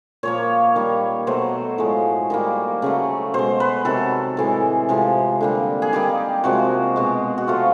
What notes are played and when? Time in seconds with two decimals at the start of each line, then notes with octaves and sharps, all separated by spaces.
0.23 A#2 F3 A#3 C#5
0.75 D#3 G3 A#3
1.27 B2 F#3 A3 C5
1.78 A2 F3 G#3
2.30 D#3 G3 A#3
2.82 C#3 F#3 A3
3.34 B2 G#3 C5
3.60 B4
3.85 C3 D#3 F#3 A4
4.37 A2 E3 G#3
4.89 C3 F3 G#3
5.41 D3 G3 A#3
5.82 G#4
5.93 D#3 G3 A#3 G4
6.44 C3 F3 G#3 F#4
6.96 B2 G#3
7.38 F#4
7.47 C3 F3 A3 F4